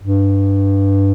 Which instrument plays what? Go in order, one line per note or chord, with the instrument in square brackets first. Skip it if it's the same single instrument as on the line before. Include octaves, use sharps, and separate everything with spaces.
[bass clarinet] G2